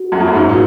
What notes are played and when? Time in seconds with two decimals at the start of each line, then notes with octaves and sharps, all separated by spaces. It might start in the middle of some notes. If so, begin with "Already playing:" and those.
Already playing: F#4
0.12 F#2
0.20 F2
0.27 F#2
0.34 G#2
0.49 A#2